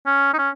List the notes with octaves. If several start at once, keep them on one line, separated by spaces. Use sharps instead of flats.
C#4
D#4
C#4